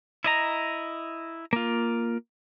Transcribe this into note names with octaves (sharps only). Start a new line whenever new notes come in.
E4 D#5 A#5
A#3 F4